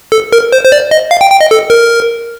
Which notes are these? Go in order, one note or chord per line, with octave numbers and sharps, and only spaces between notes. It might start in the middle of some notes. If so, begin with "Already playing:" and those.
A4
A#4
C5
C5
D5
D#5
F5
G5
G5
D#5
A4
A#4